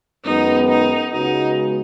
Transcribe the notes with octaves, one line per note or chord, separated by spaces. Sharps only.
F#2 D#3 G#3 B3 D#4
D#4
C#2 C#3 G#3 B3 D#4 F#4